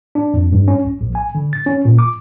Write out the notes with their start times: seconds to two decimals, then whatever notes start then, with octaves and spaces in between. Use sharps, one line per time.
0.15 D4
0.34 F2
0.52 G2
0.68 C#4
0.85 B1
1.01 A#1
1.15 G#5
1.35 D3
1.53 A6
1.66 C#4
1.85 A#2
1.99 D6